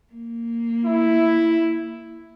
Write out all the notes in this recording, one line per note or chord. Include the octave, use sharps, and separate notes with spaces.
A#3
E4